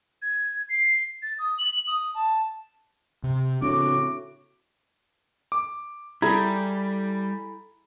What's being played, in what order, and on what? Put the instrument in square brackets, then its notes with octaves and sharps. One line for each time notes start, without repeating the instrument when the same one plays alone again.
[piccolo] G#6
C7
A6
D#6
F#7
D#6
A5
[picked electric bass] C3
[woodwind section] A2 F#4 D6 [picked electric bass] C#3 C4 D4
[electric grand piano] D6
[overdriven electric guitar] G3 [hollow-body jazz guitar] E4 G#4 A4 [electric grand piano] A#5 B5 G#6